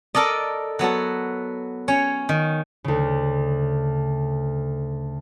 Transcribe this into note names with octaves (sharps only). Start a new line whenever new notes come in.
A4 A#4 D5 D#5
F#3 B3 F#4 A4
C#4 C#5
D#3
D2 C#3